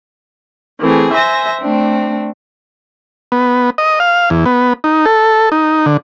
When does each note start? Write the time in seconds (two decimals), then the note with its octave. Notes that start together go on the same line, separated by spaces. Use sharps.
0.81 E3 A3 C4 G#4
1.13 C5 E5 G#5 A#6
1.60 A3 C4 D4
3.32 B3
3.78 D#5
4.00 F5
4.30 E2
4.46 B3
4.84 D#4
5.06 A4
5.52 D#4
5.86 D3